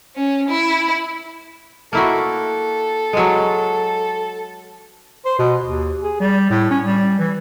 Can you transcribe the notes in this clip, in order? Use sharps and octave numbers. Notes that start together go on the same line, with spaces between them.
C#4
E4
A#3 E4 F#4 A4
F#3 G#3
C5
B2
D#2
G#4
G3
A2
C#4
G3
E3